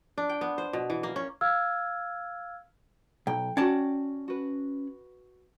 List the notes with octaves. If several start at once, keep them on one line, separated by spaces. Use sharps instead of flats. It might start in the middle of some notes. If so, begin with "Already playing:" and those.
D4
G5
B3
C5
B2
E3
A#3
C#4
F5 E6 F6 G#6
B1 G5
C#4 F#4 D5 G5 A5
F#4 B4